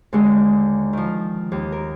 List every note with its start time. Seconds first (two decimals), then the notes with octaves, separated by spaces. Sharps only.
0.13 D#2 D3 D#3 G#3
0.93 D#3 F3
1.52 D#2
1.72 A#4